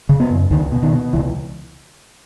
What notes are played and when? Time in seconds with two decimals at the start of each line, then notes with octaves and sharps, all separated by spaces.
0.09 C#3
0.20 B3
0.30 F#2
0.51 C#2 D#3
0.72 B2
0.83 D#3
0.93 B2
1.13 C#2 E3